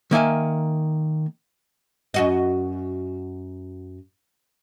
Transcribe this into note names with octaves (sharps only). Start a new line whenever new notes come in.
D#3 A#3 E5 G#5
F#2 F#4 D#5